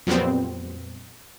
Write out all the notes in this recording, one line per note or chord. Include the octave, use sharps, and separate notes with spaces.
F2 A#2 F#3 G3 B3 C4